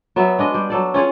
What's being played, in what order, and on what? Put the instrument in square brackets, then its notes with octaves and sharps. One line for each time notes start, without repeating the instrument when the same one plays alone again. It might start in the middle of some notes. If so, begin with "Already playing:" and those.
[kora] F#3 B3 F#4 E5
G#3 D4 D#5
G3
F#3 A4 D5
C#4 F4 G#4 C#5